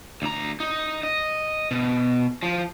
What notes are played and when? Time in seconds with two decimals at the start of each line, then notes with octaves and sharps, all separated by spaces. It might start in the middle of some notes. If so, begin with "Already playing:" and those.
0.22 D2 A#5
0.60 D#4
1.03 D#5
1.71 B2
2.43 F3